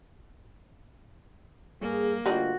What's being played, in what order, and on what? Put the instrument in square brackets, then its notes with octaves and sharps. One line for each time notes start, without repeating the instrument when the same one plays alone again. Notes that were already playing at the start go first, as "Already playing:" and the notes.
[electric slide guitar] G2 [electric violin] A#3 [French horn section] G#4
[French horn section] D2 F4 [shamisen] G3 D4 D#4 [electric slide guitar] F#4